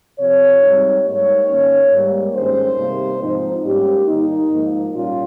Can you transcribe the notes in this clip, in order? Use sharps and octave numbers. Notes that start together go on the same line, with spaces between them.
C3 F3 C4 C#5
G#2 G3 C4 D#4
G#2 G3 A#3 D#4 C#5
D#3 A#3 C#4
G#2 G3 A#3
G2 D#3 G#3 C#4 C5
C3 D#3 G3 A#3
G#2 F3 C4 D#4
G#2 G3 A#3 C#4 G4
D#3 G3 A#3 D#4
G#2 F3 A#3
A#2 G3 C#4 F4